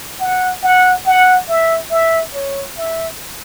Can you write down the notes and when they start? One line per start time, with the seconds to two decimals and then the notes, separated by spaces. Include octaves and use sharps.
0.20 F#5
0.63 F#5
1.06 F#5
1.48 E5
1.91 E5
2.34 C#5
2.77 E5